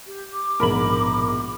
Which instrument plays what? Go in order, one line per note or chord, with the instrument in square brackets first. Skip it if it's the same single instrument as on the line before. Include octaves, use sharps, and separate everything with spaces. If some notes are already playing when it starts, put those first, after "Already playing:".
[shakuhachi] G4
D6
[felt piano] A#1 G#2 B2 [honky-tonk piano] A#4 B5 F#7